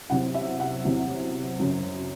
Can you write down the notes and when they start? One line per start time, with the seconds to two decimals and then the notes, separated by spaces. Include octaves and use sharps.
0.10 E2 C3 F#3 C4 F#5
0.34 E5
0.60 F#5
0.84 E2 C3 F#3 C4
1.60 F#2 C#3 F#3